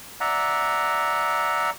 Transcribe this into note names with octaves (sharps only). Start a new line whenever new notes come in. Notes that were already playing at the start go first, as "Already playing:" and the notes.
D5 E5 F#5 A#5